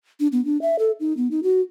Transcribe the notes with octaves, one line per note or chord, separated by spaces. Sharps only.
D4
B3
D4
E5
A4
D#4
B3
D#4
F#4